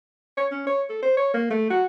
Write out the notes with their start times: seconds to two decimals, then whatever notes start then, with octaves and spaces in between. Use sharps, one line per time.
0.37 C#5
0.51 C#4
0.66 C#5
0.89 A4
1.02 C5
1.17 C#5
1.34 A#3
1.50 A3
1.70 F#4